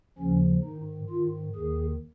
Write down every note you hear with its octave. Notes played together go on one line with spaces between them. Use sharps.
D#2 C#3 F3 C#4
G#2 D#3 D#4
G#2 D#3 F4
D#2 D#3 G#4